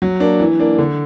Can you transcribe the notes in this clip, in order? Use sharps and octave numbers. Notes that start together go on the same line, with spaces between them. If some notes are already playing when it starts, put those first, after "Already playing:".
F#3
A#3 D4
E3
A#3 D4
D3